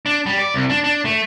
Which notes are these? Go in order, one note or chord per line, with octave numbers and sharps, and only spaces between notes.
D4
G3
D5
C2
D4
D4
A3